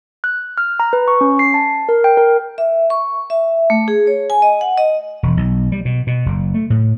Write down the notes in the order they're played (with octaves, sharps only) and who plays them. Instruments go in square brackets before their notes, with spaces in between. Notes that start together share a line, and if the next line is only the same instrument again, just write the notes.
[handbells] F#6
F6
A#5
B4
C#6
C#4
C7
A5
A#4
G5
A#4
[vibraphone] E5
C#6
E5
A3
G#4
C#5
G#5
D#5
F#5
D#5
[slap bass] E1
B1
G3
B2
B2
F#1
A3
A2